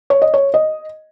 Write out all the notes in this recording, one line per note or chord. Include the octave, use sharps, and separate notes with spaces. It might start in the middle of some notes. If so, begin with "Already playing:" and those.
C#5
D#5
C#5
D#5